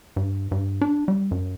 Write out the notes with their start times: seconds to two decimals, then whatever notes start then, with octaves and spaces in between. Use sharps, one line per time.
0.16 G2
0.51 G2
0.81 D4
1.08 G3
1.31 F#2